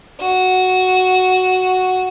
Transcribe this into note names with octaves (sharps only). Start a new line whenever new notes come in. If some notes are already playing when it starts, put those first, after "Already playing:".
F#4